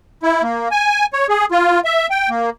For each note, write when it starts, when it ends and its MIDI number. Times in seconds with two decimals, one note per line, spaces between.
0.23 0.43 64
0.43 0.68 58
0.71 1.06 80
1.13 1.26 73
1.29 1.45 68
1.51 1.80 65
1.85 2.07 76
2.10 2.29 79
2.29 2.50 58